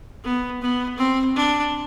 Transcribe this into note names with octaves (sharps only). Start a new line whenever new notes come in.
B3
B3
C4
D4